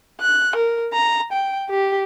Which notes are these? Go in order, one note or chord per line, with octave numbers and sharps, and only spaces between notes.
F#6
A#4
A#5
G5
G4